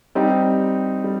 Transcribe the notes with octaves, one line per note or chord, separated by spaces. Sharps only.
G3 C4 D#4 G4
G3